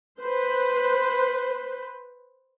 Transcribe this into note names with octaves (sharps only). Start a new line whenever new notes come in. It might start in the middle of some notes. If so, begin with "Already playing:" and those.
B4 C5